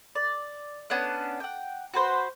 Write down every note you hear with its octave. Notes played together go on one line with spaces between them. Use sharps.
D5
B3 C#4 D4 F#5
F#5 G5
F#4 B4 C5